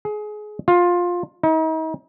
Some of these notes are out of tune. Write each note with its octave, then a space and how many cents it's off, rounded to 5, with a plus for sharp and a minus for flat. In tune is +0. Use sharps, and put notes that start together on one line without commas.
G#4 +25
F4 +15
D#4 +40